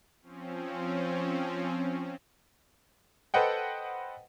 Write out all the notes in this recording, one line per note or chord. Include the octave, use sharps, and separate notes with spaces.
F3 C4 C#4
A4 B4 C5 D#5 F#5 G5